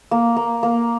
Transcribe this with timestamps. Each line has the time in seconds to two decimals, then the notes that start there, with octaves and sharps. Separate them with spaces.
0.11 A#3
0.36 A#3
0.63 A#3